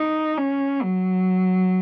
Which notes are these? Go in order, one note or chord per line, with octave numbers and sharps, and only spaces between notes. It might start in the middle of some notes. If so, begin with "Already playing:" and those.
Already playing: D#4
C#4
F#3